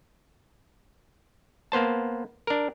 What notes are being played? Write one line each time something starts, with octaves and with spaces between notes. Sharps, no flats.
A#3 B3 C5 A5
D4 A#4